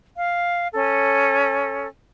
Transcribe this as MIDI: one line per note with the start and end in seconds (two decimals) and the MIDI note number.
0.16 0.67 77
0.73 1.87 61
0.73 1.87 69